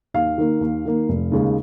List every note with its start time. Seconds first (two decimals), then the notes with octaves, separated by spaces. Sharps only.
0.14 D#2 F5
0.38 D#3 A#3
0.61 D#2
0.85 D#3 A#3
1.09 F1
1.32 D#2 C#3 G#3